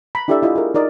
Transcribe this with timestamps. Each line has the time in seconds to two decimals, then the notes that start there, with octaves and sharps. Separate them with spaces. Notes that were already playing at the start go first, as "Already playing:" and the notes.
0.15 A#5 B5
0.28 D4 E4 G4 A4 D5 E5
0.43 E4 F4 G4 D#5 E5
0.55 G#4 A#4
0.74 D#4 A#4 D5 D#5